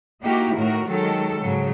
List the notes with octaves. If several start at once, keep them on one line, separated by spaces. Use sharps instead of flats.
A#3 D#4 E4 F#4 G4
A2 D#3 F#4 A#4
D#3 F#3 G#3 A4
G#2 C#3 F#3